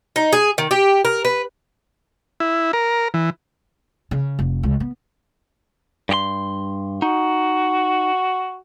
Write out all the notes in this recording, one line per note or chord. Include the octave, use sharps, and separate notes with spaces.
D#4
G#4
D#3
G4
A#4
B4
E4
A#4
E3
C#3
F1
C#2
B3
G2 G4 C6
D#4 F#4